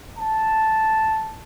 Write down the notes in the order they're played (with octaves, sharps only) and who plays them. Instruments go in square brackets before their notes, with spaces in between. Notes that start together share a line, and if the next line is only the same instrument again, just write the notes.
[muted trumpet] A5